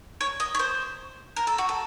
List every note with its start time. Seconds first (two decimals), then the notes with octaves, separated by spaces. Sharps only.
0.21 C#5
0.40 D#5
0.55 C#5
0.59 C5
1.36 A#4
1.47 A4
1.58 F#4
1.69 A4